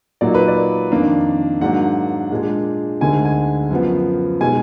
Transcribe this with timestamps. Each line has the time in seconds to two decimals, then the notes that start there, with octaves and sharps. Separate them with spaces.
0.21 A#2 F#3 A#3 D#4 D5
0.34 B4
0.48 D5
0.92 F2 D#3 A#3 D4
1.61 G#2 F#3 A#3 D4 F#5
2.31 A#2 G#3 D4
3.01 D2 D3 G#3 D#4 G#5
3.25 G#5
3.71 F#2 F3 B3
4.41 B2 G#3 D#4 G#5